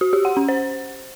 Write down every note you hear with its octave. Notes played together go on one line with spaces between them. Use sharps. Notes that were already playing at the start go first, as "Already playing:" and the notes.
F#4
G4
F#5
C#4
C5